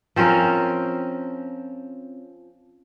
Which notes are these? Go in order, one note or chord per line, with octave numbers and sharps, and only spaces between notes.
F3 C4 C#4 A#4